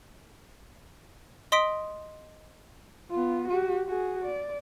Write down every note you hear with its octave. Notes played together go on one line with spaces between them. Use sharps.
D#5 C6 D#6 B6 D7
B3 F4
F#4 G4
F#4 G#4
D5